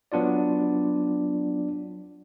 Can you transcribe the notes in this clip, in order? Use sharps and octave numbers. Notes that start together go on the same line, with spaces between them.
F#3 B3 D4 F4 D5